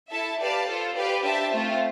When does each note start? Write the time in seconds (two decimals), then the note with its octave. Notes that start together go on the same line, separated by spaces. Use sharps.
0.10 E4 A4 E5 A5
0.39 G4 B4 D5 F5 A5
0.66 F4 A4 C5
0.95 G4 B4 D5 F5
1.23 D4 G4 C5 E5 A5
1.52 A3 C4 F4 C5